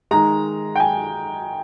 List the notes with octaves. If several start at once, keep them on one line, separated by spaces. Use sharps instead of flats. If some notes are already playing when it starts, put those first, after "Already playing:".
D#3 G#3 A#5
G5
G#5